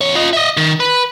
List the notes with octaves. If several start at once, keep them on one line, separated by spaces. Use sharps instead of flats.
E2 C#5
F4 D#5
D#5 E5
D#3
B4